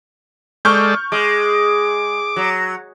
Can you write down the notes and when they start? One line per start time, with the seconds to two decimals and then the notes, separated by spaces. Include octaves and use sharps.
0.65 G#3 A4 D5 C#6 F6 G6
1.12 G#3 D6
2.36 F#3